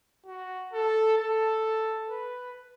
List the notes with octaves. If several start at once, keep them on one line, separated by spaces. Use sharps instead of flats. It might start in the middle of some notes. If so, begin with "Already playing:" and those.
F#4
A4
A4
B4